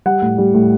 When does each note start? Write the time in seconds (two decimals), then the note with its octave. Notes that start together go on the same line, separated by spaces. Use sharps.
0.06 G3 F#5
0.22 A2
0.38 G3
0.54 A2